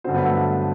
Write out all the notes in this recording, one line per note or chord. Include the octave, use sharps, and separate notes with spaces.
G2 D3 F#3 C4 C5
B3 B4
A3 A4